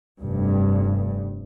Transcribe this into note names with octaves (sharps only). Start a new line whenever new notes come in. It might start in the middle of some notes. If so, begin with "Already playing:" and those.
F1 G2